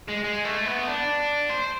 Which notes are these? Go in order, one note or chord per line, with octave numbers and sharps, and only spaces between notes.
G#3
G#3
A3
B3
D4
C5